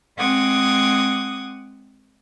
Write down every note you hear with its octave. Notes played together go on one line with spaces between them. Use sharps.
G#3 C4 F#5 D6 D#6 G#6